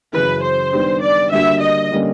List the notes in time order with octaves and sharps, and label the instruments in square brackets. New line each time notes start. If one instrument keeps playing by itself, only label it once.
[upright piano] F#2 C#3 E3 [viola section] B4
[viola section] C5
[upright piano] D#3 G3 B3 D4 G4
[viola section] D5
[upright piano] D3 G3 A#3 D4 F#4 [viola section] E5
[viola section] D#5
[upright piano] D3 G3 A#3 C#4